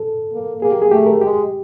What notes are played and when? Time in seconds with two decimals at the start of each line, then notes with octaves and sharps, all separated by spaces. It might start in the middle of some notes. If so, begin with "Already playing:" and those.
Already playing: A4
0.33 A#3
0.62 A#3 G#4
0.72 G4
0.82 G#4
0.91 A3 G4
1.06 A#4
1.21 G#3 G4